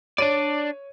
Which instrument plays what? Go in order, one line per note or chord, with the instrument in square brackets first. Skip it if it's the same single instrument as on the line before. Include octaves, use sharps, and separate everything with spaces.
[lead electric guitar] D4 D5 [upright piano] C#5 D#7